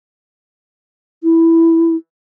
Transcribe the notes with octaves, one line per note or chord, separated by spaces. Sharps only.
E4